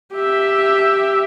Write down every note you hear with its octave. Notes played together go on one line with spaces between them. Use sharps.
G4 E5